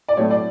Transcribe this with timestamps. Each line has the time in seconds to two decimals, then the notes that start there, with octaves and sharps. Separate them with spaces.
0.08 D5
0.17 A2 F#3 A3 C#5
0.31 D5